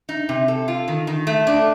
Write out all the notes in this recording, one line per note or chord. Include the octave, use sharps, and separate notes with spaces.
D#4
C3
A4
F4
D#3
D#3
A3
D4